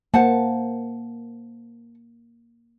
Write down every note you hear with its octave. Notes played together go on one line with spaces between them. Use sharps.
A#3 C5 F#5 A5